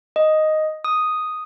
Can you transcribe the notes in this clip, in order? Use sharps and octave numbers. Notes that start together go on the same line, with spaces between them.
D#5
D#6